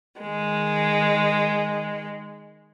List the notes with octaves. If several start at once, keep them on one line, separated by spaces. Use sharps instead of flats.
D#3 G#3